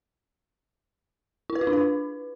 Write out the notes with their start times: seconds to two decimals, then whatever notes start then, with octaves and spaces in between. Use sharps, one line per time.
1.50 E4
1.55 B4
1.61 F4
1.67 D4
1.73 B4